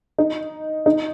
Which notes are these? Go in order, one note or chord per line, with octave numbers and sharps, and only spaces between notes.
D#4
D#4